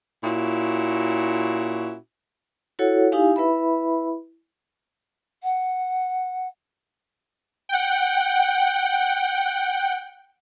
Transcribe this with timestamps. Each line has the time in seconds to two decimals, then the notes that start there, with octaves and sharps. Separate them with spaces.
0.24 A#2 C#4 E4 F#4
2.79 E4 F#4 A4 C#5 F#5
3.12 D#4 E4 G4 F5 G#5
3.36 E4 B4 E5 B5
5.43 F#5
7.69 F#5 G5